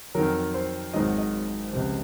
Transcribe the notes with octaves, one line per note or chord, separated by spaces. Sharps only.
F2 D#3 F#3 A#4
C5
G#1 G#2 D#3 F#3 D#5
D#5
C#2 C3 F3